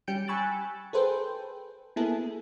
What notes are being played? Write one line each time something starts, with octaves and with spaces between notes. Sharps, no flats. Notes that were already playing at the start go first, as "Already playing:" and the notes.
G3 C#4 G5 G6 C#7 D7
G#5 B5 C#6 E6 F#6 A6
G#4 A4 B4 C5 G5
A#3 B3 E4 G#4 A4